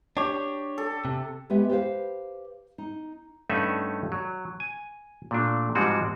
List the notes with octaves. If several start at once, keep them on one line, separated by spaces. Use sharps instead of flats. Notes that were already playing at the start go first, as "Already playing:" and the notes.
D4 G4 C#5
A4
C3
G#3 B3 G4 B4 E5
G4 B4 C5 F5
D#4
G2 A3 C#4 D#4 E5 F#5
F#3
G#5
A#2 A3 D4
G#2 F3 G3 G#3 C4 F#4